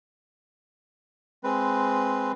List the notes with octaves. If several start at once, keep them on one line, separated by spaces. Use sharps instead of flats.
G#3 C4 B4